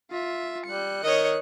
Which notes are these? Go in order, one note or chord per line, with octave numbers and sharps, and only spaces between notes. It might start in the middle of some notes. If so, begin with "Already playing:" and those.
F4 E5
G3 F#6 C#7
D#3 C#5 D#5